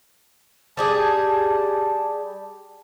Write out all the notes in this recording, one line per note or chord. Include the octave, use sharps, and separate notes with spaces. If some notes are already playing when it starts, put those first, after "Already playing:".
G3 G4 G#4 A5